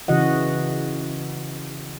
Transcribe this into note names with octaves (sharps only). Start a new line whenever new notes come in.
C#3 E3 F#4 D#5 F#5